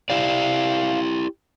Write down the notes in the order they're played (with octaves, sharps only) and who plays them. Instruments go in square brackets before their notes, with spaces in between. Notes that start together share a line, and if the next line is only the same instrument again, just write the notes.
[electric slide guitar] E4 G4 D5 [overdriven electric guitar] F5